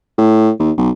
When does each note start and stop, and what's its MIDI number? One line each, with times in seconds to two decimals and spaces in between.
0.18 0.50 45
0.60 0.71 39
0.78 0.90 35